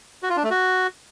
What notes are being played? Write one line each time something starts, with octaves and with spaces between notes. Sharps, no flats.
F#4
F4
D4
A3
F#4